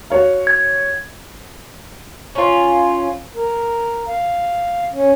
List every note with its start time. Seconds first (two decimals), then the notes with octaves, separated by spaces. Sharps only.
0.10 F#4 C#5 F5
0.47 G#6
2.35 C#4 F4
3.36 A#4
4.08 F5
4.93 C#4